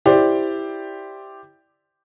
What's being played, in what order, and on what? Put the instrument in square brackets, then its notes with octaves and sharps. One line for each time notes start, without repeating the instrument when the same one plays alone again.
[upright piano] E4 G4 C5 D5